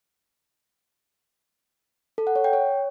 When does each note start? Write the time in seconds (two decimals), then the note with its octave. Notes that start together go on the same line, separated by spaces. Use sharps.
2.18 A4
2.27 F#5
2.36 C#5
2.44 G5
2.53 C#5